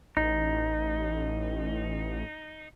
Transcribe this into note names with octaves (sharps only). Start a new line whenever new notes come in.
A1 D#4